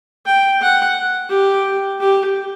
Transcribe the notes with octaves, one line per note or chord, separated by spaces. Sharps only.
G5
F#5
G4
G4